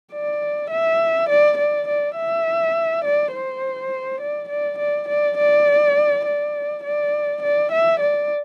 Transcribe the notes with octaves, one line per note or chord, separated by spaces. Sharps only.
D5
E5
D5
D5
D5
E5
D5
C5
D5
D5
D5
D5
D5
D5
D5
D5
E5
D5